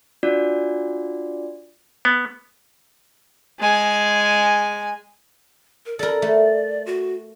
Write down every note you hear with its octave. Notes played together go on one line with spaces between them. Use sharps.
D4 F4 F#4 D5
B3
G#3 G#5
A#4
A4 A#4 D5
A3
F#4